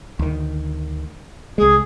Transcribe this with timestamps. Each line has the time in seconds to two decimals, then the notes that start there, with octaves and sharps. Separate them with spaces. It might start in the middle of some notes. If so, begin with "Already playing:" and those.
0.19 D2 D#3
1.58 C2 G#3 G#4